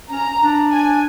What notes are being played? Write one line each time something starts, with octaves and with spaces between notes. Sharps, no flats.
C#4 A#5
D4
G#5